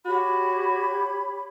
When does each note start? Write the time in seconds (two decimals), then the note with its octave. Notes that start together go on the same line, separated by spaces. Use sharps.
0.05 F#4 G4 C#5 B5